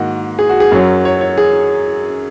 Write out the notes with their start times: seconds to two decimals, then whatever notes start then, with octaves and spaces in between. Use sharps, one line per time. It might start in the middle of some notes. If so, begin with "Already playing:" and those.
Already playing: G#2 D#3 A#3 F#4
0.39 G#4
0.49 F#4
0.60 G#4
0.71 F#2 F#3 C#4
1.05 C#5
1.21 C#5
1.38 G#4